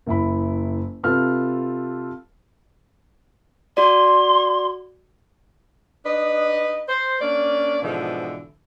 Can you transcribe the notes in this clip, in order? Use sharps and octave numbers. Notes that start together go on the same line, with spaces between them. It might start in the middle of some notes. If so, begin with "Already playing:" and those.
F#1 E4 B5
C3 F4 A4 B4 F6
F#4 D5 C6
D4 D#4 B4 D#5
C5
A#3 C#4 D4 D5
G#2 B2 D3 E3 F3